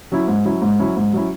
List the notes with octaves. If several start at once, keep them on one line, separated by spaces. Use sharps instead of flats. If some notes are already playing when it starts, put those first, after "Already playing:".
F#3 C#4 E4
G#2
F#3 C#4 E4
G#2
F#3 C#4 E4
G#2
F#3 C#4 E4